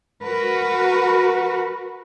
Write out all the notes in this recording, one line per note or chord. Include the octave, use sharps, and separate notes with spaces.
F#4 A#4 B4